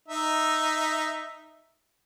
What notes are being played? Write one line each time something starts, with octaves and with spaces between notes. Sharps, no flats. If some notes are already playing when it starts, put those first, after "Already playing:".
D#4 E5